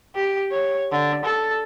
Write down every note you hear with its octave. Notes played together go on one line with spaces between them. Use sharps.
G4
C#5
D3
A4